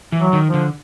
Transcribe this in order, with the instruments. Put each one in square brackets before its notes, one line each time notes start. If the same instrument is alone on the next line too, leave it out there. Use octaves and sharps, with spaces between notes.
[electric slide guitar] E3
[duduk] F#3
[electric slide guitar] D#3
[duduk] F3
[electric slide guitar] D3